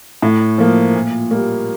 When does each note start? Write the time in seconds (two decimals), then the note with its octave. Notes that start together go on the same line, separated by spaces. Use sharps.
0.22 A2
0.58 F3 A#3
0.95 A#2
1.31 G3 A#3